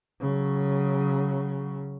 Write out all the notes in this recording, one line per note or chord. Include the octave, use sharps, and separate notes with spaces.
C#3 F#3